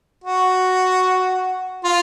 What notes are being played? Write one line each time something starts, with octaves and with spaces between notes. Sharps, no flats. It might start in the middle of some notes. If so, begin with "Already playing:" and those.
F#4
F4